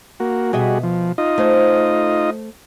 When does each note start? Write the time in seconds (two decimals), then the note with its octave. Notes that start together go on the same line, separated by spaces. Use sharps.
0.20 A#3 F#4
0.53 B2 G3 F#4 G#4 D#5 E5
0.83 F3
1.18 D#4 F4 D#5
1.38 A3 C5 C#5